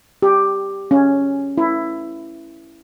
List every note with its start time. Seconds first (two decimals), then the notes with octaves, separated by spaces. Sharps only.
0.22 G4
0.91 C#4
1.58 E4